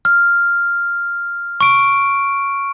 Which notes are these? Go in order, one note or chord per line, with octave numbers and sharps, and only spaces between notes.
F6
C#6 D7